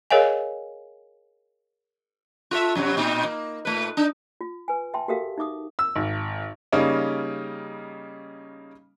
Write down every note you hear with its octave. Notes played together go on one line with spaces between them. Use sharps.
G#4 A#4 C#5 D#5 F5 G#5
F4 A4 E5
F#2 C3 F#3
A#2 C4 D#4
A#3
A#2 A3 B4
D4 D#4
F4
B4 G#5
E5 G5 A5 C6
F#4 G4 A4 A#4 E5 F5
D#4 E5 D6 D#6
E6
G#1
C#3 G3 A#3 C#4 D#4